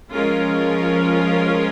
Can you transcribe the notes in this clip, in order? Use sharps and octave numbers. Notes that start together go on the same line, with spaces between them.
F3 G#3 C#4 F4 A#4